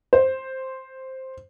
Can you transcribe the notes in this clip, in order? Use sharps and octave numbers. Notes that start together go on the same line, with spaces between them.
C5